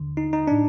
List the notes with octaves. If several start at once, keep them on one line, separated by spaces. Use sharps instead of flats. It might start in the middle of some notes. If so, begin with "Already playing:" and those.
Already playing: D#2 D3
D#4
D#4
A2 D4